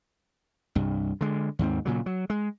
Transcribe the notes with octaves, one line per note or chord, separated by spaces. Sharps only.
C2 G2
D3 G#3
D#2 G#2 C4
A#2 C#3 F#3
F#3
G#3